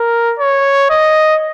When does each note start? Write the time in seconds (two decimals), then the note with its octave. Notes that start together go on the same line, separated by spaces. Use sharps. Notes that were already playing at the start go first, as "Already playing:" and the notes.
Already playing: A#4
0.39 C#5
0.90 D#5